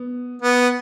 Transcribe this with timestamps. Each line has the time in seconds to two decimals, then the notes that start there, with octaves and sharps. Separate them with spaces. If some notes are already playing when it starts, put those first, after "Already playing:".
Already playing: B3
0.42 B3